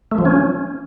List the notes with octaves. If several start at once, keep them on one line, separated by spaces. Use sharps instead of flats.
A3
F3
C#4